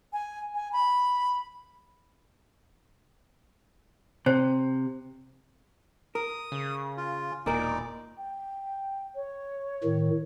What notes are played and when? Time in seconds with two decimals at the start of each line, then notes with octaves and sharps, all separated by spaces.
0.13 G#5
0.55 G#5
0.73 B5
4.26 C3 C5
6.15 A#4 D#6
6.52 C#3
6.97 F4
7.46 E1 A#2 D#4 A#4 D5
8.18 G5
9.15 C#5
9.84 A2 D#3